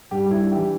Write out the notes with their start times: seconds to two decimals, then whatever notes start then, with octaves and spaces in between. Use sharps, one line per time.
0.11 G2 G4
0.26 G3
0.31 E4
0.42 D4
0.52 G4
0.57 E3